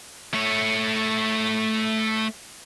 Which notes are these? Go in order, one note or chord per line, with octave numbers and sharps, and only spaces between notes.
A3 C#5